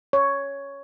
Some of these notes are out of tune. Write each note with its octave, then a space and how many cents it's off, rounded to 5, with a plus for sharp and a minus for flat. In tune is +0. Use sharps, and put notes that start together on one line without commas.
C#5 +5